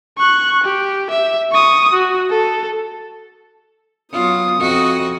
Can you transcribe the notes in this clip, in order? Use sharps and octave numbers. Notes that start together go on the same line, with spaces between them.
C#6 F#6
G4
E5
C#6 D#6
F#4
A4
F#3 B3 F4 D#6
F2 F#4 D#5